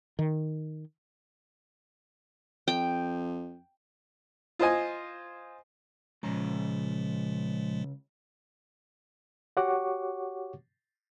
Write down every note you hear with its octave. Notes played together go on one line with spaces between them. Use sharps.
D#3
F2 G5
F4 C5 D#5 G#5
C#2 A#2 C#3 F3 G#3 A#5
F#4 G4 C#5 F#5 C#6 D6